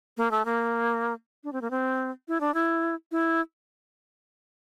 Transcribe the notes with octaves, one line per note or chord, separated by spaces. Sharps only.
A#3
A3
A#3
D4
C4
A#3
C4
E4
D4
E4
E4